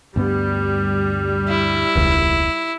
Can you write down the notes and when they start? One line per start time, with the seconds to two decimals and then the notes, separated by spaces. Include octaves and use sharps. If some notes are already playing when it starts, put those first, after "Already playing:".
0.16 D2 G2 G3 B3
1.48 E4
1.96 E1 C#2